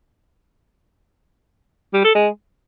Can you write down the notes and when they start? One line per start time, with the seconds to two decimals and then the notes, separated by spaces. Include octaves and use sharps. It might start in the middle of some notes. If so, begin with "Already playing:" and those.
1.93 G3
2.04 A4
2.15 G#3